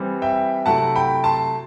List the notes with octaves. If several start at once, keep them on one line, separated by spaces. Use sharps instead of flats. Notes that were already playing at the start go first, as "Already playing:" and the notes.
Already playing: E3 G3 C4
E5 G5
C3 F#3 A3 E4 F#5 A5
G5 B5
A5 C6